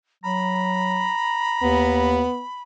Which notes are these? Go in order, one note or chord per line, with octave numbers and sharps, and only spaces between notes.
F#3 A#5 B5
D#2 B3